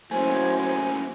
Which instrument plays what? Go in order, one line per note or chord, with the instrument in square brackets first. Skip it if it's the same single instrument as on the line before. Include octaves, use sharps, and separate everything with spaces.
[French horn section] F#3 E4 F#4 [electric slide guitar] A3 A#3 C#4 [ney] C5 [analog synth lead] G#5